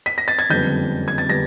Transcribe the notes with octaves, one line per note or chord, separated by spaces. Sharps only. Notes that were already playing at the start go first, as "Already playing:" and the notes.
B6
A#6
A6
G#6
F#1 F2 D3 G3 B3 G6
G#6
A6
D3 G3 B3 A#6